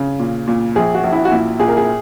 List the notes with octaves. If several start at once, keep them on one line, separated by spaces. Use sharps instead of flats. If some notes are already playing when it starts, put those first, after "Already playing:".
Already playing: C#3
A#2
A#2
A#1 G#4
F#4
A#1
E4
F#4
A#2 E4
A#2 G#4
A#4
G#4